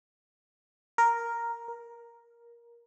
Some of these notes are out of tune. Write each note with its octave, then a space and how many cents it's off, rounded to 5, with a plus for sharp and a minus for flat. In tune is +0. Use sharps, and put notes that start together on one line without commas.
A#4 +0
A#4 +15